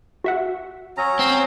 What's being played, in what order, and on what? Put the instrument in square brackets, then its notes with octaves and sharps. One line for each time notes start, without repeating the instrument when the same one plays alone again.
[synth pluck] F#4 E5 F#5
[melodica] F#3 C#4 A#5
[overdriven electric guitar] C4